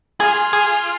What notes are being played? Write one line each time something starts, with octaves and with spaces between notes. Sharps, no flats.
F4 G#4
G#4